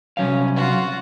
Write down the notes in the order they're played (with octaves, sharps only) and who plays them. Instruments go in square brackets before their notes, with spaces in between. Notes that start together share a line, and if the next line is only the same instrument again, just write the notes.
[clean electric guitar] C2 F#3 F5 [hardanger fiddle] C#4
[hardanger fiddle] F4 F#4